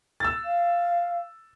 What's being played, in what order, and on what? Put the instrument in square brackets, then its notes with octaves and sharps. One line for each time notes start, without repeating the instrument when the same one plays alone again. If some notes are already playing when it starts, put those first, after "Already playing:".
[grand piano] E6 A6
[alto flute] F5